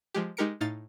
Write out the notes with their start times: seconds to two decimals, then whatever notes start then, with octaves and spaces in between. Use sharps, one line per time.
0.14 F3 G#3 G4
0.37 G#3 D#4 G4 A#4 C#7 D7
0.61 A2 D#4 F5 A6